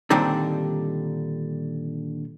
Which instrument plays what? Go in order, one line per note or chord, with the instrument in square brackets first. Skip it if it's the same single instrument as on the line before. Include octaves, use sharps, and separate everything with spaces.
[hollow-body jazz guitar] A#2 D3 D#3 G3 C4 D4